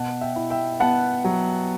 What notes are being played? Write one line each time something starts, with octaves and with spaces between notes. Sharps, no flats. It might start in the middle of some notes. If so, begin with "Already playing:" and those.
Already playing: B2 F#5 A5
E5 G5
E4
E5 G5
B3 F#5 A5
F#3